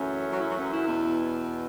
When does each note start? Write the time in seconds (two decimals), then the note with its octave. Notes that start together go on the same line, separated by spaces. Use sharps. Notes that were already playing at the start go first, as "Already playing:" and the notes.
Already playing: F#2 E3 A3 C#4
0.31 F#3 F#4
0.40 E4
0.50 F#3 F#4
0.60 C#4
0.73 E4
0.87 E2 B2 B3